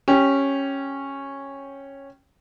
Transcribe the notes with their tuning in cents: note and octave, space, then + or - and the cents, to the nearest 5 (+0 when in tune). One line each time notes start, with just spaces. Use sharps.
C#4 -10 G4 +0